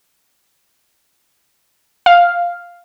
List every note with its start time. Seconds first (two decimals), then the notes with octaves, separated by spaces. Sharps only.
2.06 F5